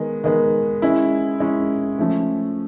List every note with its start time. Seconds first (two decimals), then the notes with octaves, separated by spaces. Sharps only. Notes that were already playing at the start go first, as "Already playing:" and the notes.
Already playing: D#3 G#3 B3
0.24 D#3 G#3 B3
0.82 G#3 C#4 E4
1.40 G#3 C#4 E4
1.99 F3 A3 C#4